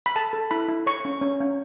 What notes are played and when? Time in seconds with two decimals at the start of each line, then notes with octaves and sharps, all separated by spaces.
0.06 B5
0.16 A4 A5
0.33 A4
0.51 E4 B5
0.68 E4
0.86 C#5 C#6
1.05 C#4
1.22 C#4
1.41 C#4